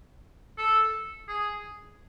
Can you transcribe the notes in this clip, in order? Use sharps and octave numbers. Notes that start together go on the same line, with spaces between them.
A4
G#4